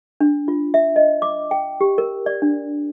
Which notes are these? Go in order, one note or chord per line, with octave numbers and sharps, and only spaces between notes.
D4
F4
E5
D#5
D6
G5
G4
A#4
D5
D4